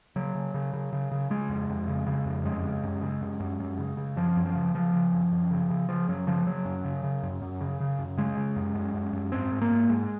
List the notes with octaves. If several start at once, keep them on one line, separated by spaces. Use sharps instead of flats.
C#3 F#3
C#3
C#3
C#3
C#3
C#3
C#3 G#3
F2
F2
C#3
C#3
F2
F#2 G#3
C#3
F#2
C#3
F#2
F#2
F#2
C#3
C#3
F#2 F3
F#2
F3
C#3
C#3 F3
C#3
F#2
F#2
C#3
C#3
C#3 F3
F#2 F#3
C#3 F3
C#3 F#3
F#2
C#3
C#3
F#2
F#2
C#3
C#3
F#2
C#3 G#3
C#3
F#2
F#2
F#2
F#2
G#2 C4
G#2
A#3
G#2
G#2 G#3